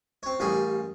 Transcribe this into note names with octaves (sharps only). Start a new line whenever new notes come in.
C4 C#5
A1 G3 A#3 G#4 B5 C#6